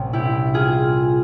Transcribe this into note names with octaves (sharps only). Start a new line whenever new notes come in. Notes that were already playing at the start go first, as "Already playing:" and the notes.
Already playing: C2 A#2 G3 C#4
E4 G4
F4 G#4